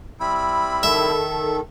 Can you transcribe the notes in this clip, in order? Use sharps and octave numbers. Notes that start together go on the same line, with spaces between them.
G3 C4 E4 B5
D#3 A4 E5